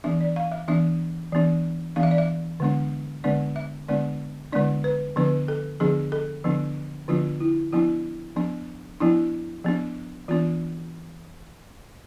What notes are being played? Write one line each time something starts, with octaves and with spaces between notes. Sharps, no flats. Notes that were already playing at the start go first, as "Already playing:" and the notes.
E3 B3 D4 E5
D5
F5
E5
E3 B3 D4 E5
E3 B3 D4
E3 B3 D4 F5
E5
D5
E5
D3 G#3 B3 D4
D3 G#3 B3 D4 D5
E5
D3 G#3 B3 D4 D5
D3 G#3 B3 D4 D5
B4
D3 F3 B3 D4 B4
A4
D3 F3 B3 D4 G#4
A4
D3 F3 B3 D4
D3 F3 B3 D4 F4
E4
F3 B3 D4 E4
F3 B3 D4
F3 B3 D4 E4
F3 B3 D4
E3 B3 D4 F4